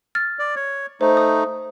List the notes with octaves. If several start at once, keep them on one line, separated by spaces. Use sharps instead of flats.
F6 A6
D5
C#5
A3 D#4 C5
D#6